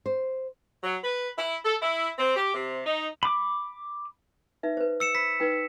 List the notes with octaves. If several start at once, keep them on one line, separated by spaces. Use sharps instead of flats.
C5
F#3
B4
E4
A4
E4
C4
G4
C3
D#4
B5 D6
D#4 B4 E5
B4 C5
E6 C#7 E7
C5 B5 B6
D#4 B4 G5